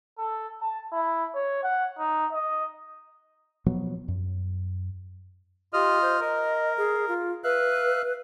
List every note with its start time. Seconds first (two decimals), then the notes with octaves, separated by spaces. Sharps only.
0.18 A4
0.61 A5
0.92 E4
1.35 C#5
1.64 F#5
1.99 D#4
2.33 D#5
3.66 B2 F3 F#3 B3
4.08 F#2
5.73 F4 G4 D#5 F6
6.02 C5
6.20 A#4 D#5
6.77 G#4
7.08 F4
7.44 B4 E5 F5 F#6